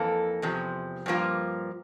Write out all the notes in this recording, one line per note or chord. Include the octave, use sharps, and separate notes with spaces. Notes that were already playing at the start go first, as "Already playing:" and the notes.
Already playing: F2 E3 A#3 A4
E2 C3 F3
G2 F3 A#3 F4